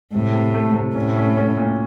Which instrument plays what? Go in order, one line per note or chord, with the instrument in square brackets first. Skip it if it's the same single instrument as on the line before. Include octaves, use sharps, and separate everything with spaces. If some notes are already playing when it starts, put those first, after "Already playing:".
[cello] A2 [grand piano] C3
[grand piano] C3
A3
C3
[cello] A2 [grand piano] C#4
[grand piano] C#4
C#4
A#2